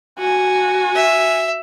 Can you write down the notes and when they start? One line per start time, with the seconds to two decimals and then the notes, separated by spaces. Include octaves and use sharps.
0.19 F#4 G#5
0.95 E5